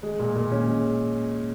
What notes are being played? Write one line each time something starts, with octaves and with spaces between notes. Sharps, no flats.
G#3
A#2
A#2
C#4
G#3